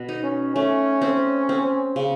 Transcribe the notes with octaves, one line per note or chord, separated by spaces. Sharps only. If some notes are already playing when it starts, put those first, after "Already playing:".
Already playing: B2
D#4
C#4
A3 C#4
C4
C4
C#3